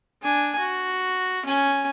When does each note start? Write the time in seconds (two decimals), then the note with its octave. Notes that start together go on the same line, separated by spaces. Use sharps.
0.23 D4 G#5
0.59 F#4
1.46 C#4 G#5